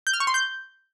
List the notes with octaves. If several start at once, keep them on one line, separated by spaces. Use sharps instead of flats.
G6
F6
C#6
C6
G6